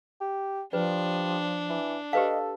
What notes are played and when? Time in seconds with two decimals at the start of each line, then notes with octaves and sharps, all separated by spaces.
0.21 G4
0.73 F3 G3 D4 B4
1.69 E3
2.13 G4 A4 B4 D#5 F5